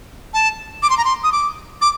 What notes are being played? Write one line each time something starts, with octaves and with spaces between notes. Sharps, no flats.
A5
D6
C6
A#5
C6
D#6
D6
D6